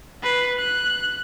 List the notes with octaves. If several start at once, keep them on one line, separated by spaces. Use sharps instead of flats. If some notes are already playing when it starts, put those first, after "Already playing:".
B4 C7
F#6